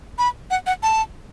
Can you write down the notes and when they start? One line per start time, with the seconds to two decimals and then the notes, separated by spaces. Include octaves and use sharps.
0.18 B5
0.51 F#5
0.67 F#5
0.83 A5